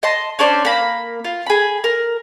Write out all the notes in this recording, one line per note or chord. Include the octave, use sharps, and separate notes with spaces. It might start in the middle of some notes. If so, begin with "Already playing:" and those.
D#5 A5 C6
C#4 D4 C5 D5
A#3 B5
F4
G#4 B5
A#4